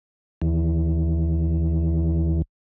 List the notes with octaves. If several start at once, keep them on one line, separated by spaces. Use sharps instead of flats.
D#2 E3